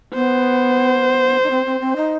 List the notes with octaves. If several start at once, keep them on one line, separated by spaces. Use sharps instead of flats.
B3 C5
D#4
C4
C4
C4
D#4